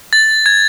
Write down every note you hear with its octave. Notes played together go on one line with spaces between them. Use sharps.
A6
G#6